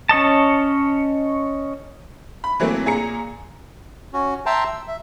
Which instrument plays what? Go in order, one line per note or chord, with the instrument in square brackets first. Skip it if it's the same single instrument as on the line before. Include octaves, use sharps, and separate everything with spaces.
[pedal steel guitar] C#4 C#5 D#5 A5
[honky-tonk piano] B5
E3 F#3 A3 A#3 C4
A#2 G#4 A#5 C#7
[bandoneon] C#4 F#4
E5 G5 A5 A#5 C6
E6
E5